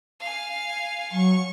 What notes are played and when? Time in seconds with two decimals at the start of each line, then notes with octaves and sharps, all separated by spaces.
0.20 F5 G#5
1.12 F#3 C#6